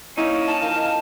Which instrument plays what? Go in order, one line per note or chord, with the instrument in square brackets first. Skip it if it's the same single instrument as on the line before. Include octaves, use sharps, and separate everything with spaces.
[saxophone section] A#3 C#4 E4 [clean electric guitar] D#4
[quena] A5
[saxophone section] F3 A#4 F5